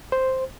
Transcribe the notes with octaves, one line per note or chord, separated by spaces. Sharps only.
C5